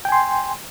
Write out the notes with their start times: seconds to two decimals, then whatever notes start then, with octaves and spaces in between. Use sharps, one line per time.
0.05 G5
0.09 G#5
0.12 C6